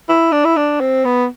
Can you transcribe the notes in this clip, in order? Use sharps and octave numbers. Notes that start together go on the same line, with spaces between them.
E4
D4
E4
D4
C4
B3